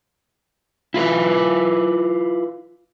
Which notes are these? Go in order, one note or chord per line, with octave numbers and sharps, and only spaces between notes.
E4 F4 A#4 B4